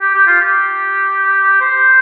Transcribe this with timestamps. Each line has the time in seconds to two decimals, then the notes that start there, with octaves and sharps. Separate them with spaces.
0.01 G4
0.15 G4
0.27 F4
0.41 G4
1.61 C5